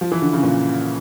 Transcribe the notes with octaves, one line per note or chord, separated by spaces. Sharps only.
F3
E3
D3
C#3
A#2